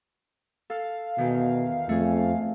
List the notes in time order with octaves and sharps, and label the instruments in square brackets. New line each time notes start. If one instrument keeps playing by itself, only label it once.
[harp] A4 [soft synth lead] F5
[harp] E2 D#3 [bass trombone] B2
[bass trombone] F2 [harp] A3 G#4